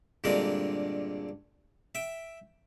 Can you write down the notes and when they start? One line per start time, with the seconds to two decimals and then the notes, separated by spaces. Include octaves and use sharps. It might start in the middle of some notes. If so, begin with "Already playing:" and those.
0.24 G2 A#2 D3 G#3 C4 A#4
1.95 E5 G5